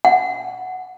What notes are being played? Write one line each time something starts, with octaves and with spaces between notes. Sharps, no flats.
F#5